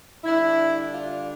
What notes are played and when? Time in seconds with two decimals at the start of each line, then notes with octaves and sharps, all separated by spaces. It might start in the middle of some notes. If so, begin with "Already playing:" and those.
0.24 D3 G3 D4 E4
0.93 F4